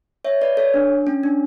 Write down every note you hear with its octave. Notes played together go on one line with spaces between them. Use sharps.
C#5 E5
B4 D5
A4 C#5
D4
C#4
D4